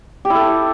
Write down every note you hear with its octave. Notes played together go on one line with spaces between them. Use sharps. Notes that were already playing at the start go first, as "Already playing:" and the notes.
G4
E4
A4